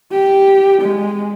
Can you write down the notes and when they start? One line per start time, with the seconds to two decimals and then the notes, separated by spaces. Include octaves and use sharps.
0.11 G4
0.81 G#3